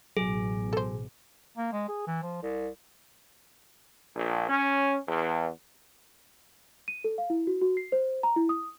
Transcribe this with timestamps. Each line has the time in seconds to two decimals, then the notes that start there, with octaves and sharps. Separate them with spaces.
0.17 A1 B2 F#3 G#4
0.73 A4 C5
1.57 A#3
1.72 G#3
1.88 G#4
2.07 E3
2.23 F3
2.42 C2
4.16 A#1
4.48 C#4
5.07 E2
6.88 D#7
7.04 A4
7.18 F5
7.30 E4
7.47 F#4
7.62 F#4
7.77 C7
7.92 C5
8.23 A#5
8.36 E4
8.49 D#6